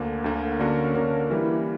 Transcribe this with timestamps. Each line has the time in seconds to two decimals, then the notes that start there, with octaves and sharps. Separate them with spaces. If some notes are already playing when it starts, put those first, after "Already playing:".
Already playing: D2 D3 A#3
0.24 D2 D3 A#3
0.59 D3 A#3 C#4 D4 F#4 A#4
0.95 D3 A#3 D4 F#4 A#4
1.30 E3 G3 A#3 E4